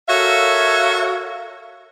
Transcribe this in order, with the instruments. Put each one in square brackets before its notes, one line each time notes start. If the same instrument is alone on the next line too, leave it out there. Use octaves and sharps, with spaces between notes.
[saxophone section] F#4 A4 A#4 C#5 E5 F5